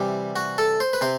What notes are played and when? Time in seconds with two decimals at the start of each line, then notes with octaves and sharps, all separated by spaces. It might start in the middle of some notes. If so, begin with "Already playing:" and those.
Already playing: C3 E3 G3 G4
0.36 F#4
0.58 A4
0.80 C5
0.93 B4
1.01 C3 C5